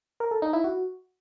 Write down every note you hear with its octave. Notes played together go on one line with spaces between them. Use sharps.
A#4
A4
D#4
E4
F#4